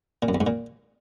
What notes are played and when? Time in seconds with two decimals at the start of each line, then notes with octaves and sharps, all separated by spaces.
0.22 A#2
0.28 F#2
0.35 E2
0.41 G#2
0.47 A#2